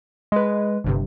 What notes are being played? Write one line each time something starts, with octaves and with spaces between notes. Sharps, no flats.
G#3 B4
G1 G2 C3